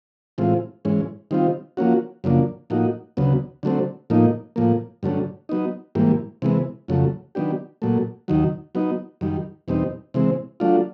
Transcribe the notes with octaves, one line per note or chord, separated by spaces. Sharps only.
A2 E3 G#3 C4 F4
G#2 E3 G#3 C#4
D#3 G3 C4 F4
F3 A#3 C#4 F#4
F#2 C#3 F3 A#3 D4
A2 F3 A#3 D#4 F#4
D2 C#3 F#3 B3
D3 F#3 A3 C4
A2 F3 A#3 D#4
A2 F3 A#3
G2 D3 F#3 A3 C#4
F#3 B3 D#4
G#2 E3 G3 A#3
C3 E3 G#3 B3
F2 C#3 F#3 A3
D#3 F#3 B3 D4 G4
A#2 F#3 A3
D#2 D#3 F#3
F#3 B3 D#4
F#2 D#3 G3
E2 B2 G3 C4 D#4
C3 E3 G#3 C4
F#3 A3 D4 F4